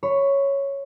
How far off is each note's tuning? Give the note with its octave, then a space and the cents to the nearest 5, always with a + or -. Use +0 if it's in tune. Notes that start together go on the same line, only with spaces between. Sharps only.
C#5 +0 B5 +20